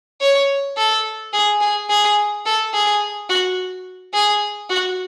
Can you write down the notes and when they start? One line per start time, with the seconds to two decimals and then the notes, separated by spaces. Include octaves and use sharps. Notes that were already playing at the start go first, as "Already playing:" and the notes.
0.21 C#5
0.77 A4
1.33 G#4
1.61 G#4
1.90 G#4
2.45 A4
2.73 G#4
3.29 F#4
4.14 G#4
4.70 F#4